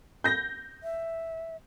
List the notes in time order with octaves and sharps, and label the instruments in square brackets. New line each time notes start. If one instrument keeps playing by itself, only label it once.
[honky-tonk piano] G6 A#6
[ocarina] E5